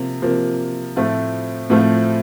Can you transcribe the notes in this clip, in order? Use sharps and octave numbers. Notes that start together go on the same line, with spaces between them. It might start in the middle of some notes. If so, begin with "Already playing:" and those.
Already playing: C3 F3 A#3
C3 F3 A#3
A2 F3 A3 C4 F4
A2 F3 A3 C4 F4